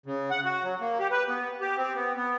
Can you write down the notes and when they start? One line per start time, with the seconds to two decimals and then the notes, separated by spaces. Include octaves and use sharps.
0.06 C#3
0.31 F#5
0.45 F#4
0.63 F#3
0.81 A#3
1.00 G4
1.11 B4
1.28 B3
1.61 G4
1.77 C4
1.95 B3
2.17 B3